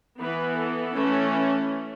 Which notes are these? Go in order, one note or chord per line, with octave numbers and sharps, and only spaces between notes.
E3 B3 B4
A4
E3 A3 C#4